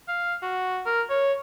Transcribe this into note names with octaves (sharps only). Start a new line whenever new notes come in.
F5
F#4
A#4
C#5